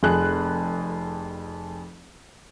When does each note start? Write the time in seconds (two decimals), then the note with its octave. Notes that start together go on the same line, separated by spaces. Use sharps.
0.03 F1 F2 G#4 F#6